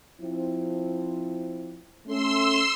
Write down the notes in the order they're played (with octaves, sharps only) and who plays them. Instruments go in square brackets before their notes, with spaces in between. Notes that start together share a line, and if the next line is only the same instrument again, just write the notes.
[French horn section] F3 C4 E4
[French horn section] A3 C#4 [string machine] C6 E6